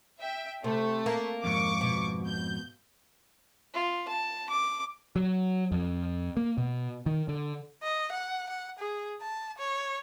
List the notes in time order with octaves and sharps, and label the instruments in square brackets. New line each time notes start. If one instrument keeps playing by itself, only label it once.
[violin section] E5 G5
[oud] C3 [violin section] A3
[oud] A#3
[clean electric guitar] F2 G#2 [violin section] C#6 D6
[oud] B2
[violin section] G6
[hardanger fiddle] F4
A5
D6
[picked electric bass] F#3
F2
A#3
B2
D#3
D3
[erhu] D#5
F#5
F#5
G#4
A5
C#5